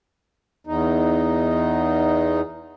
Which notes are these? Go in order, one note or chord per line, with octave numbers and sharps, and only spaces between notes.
E2 D#4